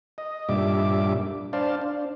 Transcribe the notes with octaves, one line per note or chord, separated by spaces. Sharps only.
D#5
G2 A#2 G3 D4 E5 D6
D4 C5 D5 F5 A5
D4